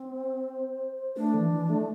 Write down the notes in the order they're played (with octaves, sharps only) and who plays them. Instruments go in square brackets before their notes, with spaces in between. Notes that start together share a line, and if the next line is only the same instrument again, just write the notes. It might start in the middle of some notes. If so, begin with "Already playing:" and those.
Already playing: [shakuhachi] C4
[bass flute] C5
[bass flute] A3 [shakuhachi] D4
[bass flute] E3
E3
A3